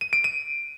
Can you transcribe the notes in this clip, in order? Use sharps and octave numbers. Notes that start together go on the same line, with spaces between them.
D#7
D7
D#7